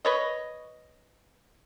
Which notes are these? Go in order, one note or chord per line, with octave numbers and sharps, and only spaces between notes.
B4 C#5 D#5